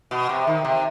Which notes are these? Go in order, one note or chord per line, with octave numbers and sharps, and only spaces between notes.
B2
C3
D#3
C3